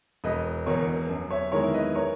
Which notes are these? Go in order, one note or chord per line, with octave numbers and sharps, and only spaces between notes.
E1 B4 D#5
E2 B2 A#4 C#5
F#2
C#5 E5
D#3 G#3 B3 E4 A#4 C#5
B4 D#5
A#4 C#5